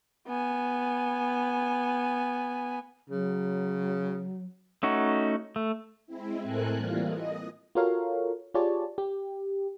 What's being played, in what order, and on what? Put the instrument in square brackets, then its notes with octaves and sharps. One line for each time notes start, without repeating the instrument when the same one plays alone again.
[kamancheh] B3 G#5
[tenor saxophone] C#3 [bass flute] F#3
[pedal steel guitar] A3 C#4 D#4 F#4
A3
[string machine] G#3 C4 E4
A2 C4 A4 A#4 G#5 F#6
E3 G3 A#3 F4
D#5
[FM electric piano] F4 F#4 A4 A#4 C#5 F5
F4 G4 G#4 C#5 D5 A5
G4